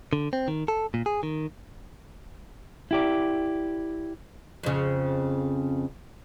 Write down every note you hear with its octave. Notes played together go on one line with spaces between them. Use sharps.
D3
C4
D#3
A4
A#2
G#4
D#3
E4 G4 D5
F2 C#3